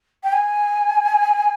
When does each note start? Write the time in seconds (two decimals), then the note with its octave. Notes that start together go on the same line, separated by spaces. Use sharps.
0.23 G5
0.32 G#5